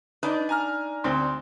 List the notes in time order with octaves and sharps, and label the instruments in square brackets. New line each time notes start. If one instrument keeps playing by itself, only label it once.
[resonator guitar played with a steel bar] D4 D#4 D5 [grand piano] B4 D#5
[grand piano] G#5 A#5 F6
[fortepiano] D2 C4 [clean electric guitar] C6